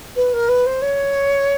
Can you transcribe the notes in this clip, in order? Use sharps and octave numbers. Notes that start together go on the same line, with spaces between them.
B4
A#4
B4
C5
C#5